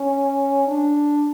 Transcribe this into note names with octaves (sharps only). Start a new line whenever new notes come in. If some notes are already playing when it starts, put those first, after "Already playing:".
Already playing: C#4
D4